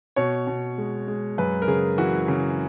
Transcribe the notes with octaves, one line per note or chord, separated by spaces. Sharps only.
B2 C#5
B2
G#3
G#3
F#2 B4
A#4
C#3 G#4
E3 F#4
C#3